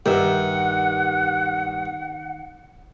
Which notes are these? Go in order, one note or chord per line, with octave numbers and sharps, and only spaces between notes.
G2 D#3 E5 F#5